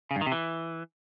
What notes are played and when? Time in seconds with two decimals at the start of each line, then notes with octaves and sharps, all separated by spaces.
0.11 C#3
0.16 G2
0.21 D#3
0.26 C3
0.32 E3